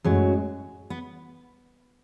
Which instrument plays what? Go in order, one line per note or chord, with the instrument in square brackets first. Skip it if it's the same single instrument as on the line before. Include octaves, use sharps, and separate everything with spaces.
[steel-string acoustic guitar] F#2 F#3 [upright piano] A2 G#3 C#4 G#4
[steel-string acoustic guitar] B3